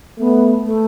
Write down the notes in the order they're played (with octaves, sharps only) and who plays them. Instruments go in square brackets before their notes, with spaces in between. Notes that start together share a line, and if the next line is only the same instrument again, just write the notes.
[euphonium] A3 [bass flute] B3
[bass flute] A3